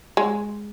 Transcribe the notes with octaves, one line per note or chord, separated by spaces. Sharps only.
G#3